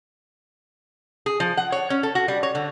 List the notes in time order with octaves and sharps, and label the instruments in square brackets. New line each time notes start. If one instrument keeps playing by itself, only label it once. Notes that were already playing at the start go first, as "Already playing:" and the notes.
[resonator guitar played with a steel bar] G#4
F3
F#5
C#5
C#4
A4
F#4
G3
C#5
D3